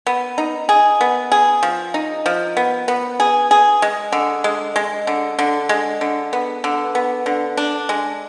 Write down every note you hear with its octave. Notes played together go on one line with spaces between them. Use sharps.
B3
D#4
G#4
B3
G#4
F3
D#4
F3
B3
B3
G#4
G#4
G#3
D3
G#3
G#3
D3
D3
G#3
D3
B3
D3
B3
D3
D4
G#3